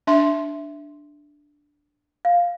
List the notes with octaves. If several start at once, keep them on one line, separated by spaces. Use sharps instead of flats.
D4 E5 C6
F5